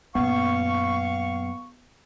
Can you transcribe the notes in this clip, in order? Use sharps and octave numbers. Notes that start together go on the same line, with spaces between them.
F#2 A#2 B3 F5 C#6